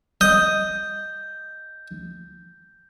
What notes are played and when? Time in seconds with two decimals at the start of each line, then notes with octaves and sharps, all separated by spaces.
0.21 D#5 G6